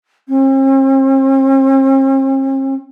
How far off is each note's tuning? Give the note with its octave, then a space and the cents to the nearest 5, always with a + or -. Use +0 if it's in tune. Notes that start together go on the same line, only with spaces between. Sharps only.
C4 +45